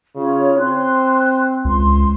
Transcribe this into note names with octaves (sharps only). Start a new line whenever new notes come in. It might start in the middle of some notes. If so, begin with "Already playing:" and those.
C#3 F4 C#5
C4 C6 F#6
C#2 C6